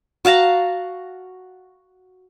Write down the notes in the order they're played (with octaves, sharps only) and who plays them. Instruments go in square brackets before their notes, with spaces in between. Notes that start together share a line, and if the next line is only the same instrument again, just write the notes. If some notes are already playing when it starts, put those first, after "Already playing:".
[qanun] F#4 F5 A5 A#5